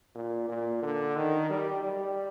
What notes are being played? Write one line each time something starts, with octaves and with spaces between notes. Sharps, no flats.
A#2
A#2
D3
D#3
G3
G3